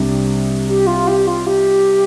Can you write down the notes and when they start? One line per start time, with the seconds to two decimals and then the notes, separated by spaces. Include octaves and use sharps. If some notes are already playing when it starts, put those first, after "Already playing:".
Already playing: C2 C3 G3 D4
0.67 G4
0.87 F4
1.07 G4
1.27 F4
1.46 G4